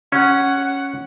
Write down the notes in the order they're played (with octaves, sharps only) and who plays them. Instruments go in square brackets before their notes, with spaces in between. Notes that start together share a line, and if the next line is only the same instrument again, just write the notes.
[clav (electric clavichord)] C#4 [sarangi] F#5